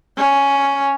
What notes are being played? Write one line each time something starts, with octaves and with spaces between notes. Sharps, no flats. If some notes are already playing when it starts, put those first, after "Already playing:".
C#4